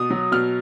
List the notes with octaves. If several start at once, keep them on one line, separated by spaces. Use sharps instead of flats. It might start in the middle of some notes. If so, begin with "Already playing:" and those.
Already playing: B2 D#6
F#3
B2 F6